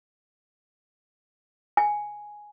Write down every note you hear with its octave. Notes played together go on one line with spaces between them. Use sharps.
G#5